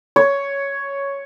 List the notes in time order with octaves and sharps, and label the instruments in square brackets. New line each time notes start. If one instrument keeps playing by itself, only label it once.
[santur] C#5